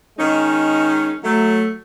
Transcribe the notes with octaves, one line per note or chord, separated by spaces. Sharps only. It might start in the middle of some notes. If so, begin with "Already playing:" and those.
D#3 G#3 C#4 D#4
F#3 A3